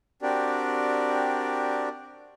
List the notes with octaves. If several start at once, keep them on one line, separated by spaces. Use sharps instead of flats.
C4 D4 F#4 G4 A#4 D5